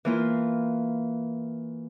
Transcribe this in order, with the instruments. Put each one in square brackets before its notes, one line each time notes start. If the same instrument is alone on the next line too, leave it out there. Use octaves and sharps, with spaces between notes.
[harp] E3 A#3 F4